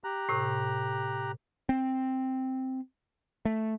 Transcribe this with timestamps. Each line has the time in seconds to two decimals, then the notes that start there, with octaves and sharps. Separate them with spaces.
0.04 G4 A#5 F#6
0.29 A2 C3
1.69 C4
3.45 A3